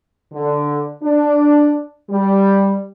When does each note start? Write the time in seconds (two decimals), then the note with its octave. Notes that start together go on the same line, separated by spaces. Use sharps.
0.33 D3
1.03 D4
2.10 G3